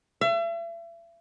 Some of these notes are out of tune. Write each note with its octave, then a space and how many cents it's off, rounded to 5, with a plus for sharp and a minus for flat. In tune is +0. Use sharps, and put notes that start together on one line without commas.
E5 +40